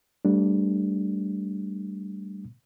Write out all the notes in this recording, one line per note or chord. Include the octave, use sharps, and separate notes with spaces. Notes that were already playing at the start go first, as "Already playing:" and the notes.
G3 A3 D4